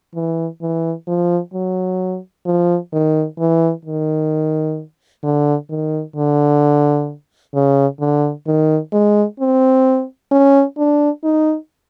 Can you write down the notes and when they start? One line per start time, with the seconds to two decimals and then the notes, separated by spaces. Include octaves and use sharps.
0.15 E3
0.61 E3
1.08 F3
1.54 F#3
2.46 F3
2.92 D#3
3.39 E3
3.85 D#3
5.23 D3
5.70 D#3
6.16 D3
7.54 C#3
8.00 D3
8.47 D#3
8.93 G#3
9.40 C4
10.31 C#4
10.77 D4
11.24 D#4